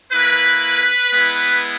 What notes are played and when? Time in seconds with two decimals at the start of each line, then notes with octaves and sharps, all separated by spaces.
0.12 A#3 E4 B4
1.12 G#3 B3 E4